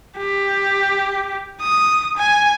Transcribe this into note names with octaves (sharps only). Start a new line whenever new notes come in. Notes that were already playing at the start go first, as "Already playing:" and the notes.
G4
D#6
G#5